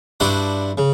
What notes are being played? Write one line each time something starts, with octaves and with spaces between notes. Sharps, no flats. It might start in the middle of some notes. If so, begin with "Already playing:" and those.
G2 D4 E4 F#4 C6
C#3